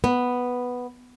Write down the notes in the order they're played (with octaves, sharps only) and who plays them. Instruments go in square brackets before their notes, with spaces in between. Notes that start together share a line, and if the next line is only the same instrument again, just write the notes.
[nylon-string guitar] B3